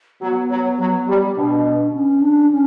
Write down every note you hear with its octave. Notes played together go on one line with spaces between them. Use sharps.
F#3 B3
F#3
F#3
G3
B2 D4
C#4
D4
C#4